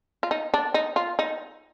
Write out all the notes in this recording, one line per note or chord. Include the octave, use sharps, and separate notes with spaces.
F4
D#4
D4
D#4
F4
D#4